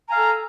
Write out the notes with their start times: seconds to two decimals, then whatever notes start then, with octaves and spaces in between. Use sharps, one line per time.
0.07 A#5
0.10 G#5
0.13 F5
0.15 A4